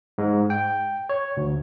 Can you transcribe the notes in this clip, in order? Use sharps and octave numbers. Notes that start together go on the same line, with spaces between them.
G#2
G5
C#5
D2